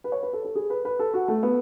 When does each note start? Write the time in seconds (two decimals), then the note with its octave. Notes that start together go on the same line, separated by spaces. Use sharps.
0.04 B4
0.12 C#5
0.23 B4
0.33 A4
0.45 A4
0.55 G#4
0.70 B4
0.85 B4
0.99 A4
1.14 F#4
1.28 A3
1.43 B3